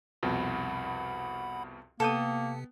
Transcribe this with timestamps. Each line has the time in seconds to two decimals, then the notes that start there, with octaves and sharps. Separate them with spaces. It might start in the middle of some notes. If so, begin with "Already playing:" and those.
0.23 C2 F2 B2 F#5 B5
2.00 C3 A#3 B3 A4 G5 D#6